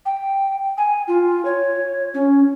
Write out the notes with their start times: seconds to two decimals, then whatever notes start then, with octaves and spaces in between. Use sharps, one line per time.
0.06 G5
0.77 G#5
1.08 F4
1.45 C#5
2.14 C#4